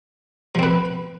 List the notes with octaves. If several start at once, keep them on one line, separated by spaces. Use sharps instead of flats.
F3 C4 B4